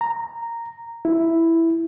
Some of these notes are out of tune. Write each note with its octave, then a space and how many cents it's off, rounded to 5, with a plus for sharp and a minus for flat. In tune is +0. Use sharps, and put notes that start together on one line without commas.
A#5 -5
E4 +0